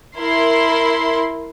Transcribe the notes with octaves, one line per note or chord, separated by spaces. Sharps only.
E4 A#4 C6